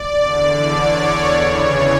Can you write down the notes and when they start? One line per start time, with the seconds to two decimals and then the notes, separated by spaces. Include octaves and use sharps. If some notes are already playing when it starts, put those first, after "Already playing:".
Already playing: D5
0.17 E2 D3
0.72 C#5
1.28 E2 C#3 E3